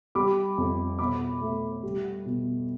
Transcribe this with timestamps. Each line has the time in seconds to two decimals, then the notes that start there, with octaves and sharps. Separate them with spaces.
0.15 G3 B5 D6
0.58 F2
0.99 B2 B5 D6
1.41 A3
1.83 G3
2.25 B2